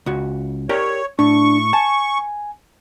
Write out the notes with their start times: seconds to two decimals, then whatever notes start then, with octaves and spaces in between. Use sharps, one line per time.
0.06 C#2 F#4
0.69 G4 A#4 C#5 D5
1.19 A2 D4 C#6
1.73 G#5 A5